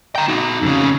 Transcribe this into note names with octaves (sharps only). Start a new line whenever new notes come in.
G5 A#5
D#4 F#4
F2 C#3